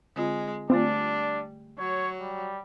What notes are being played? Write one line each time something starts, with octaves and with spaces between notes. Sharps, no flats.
D3 G#3 C4 F4
D3 G3 A3 C4 D4 F4
F#3 C#5
G3